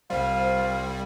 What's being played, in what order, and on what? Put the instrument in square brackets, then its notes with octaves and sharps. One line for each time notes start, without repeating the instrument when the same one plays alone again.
[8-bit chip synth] C2 G3 [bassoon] F4 [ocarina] C5